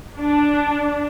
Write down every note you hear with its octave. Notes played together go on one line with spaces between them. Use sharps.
D4